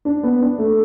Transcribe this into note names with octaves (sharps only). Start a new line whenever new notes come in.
D4
B3
D4
A3